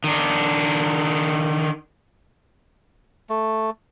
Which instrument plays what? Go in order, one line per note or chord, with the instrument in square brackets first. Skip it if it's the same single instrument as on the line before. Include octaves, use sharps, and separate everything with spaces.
[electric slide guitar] D#3 D4
[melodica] A3